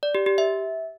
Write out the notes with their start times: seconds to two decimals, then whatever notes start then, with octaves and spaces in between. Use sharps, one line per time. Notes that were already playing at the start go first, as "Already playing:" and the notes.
0.03 D5
0.15 G4
0.26 G4
0.38 E5